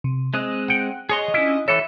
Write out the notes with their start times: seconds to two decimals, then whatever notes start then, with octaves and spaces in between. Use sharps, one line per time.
0.04 C3
0.34 G#3 C4 D#5 F#6
0.68 F#5 G5
1.09 G#4 C#5 D#5 C6
1.34 C#4 D4 E4 F4
1.68 E3 A4 C#5 E5